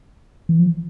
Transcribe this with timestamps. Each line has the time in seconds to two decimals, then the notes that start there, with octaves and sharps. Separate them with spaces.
0.49 E3
0.59 F3